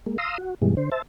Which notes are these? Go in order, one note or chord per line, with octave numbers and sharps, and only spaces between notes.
G#3 A#3
F5 A#5 C6 D#6 E6
F#4
G2 B2 E3 G3 G#3
D3 C5
C5 E5 A5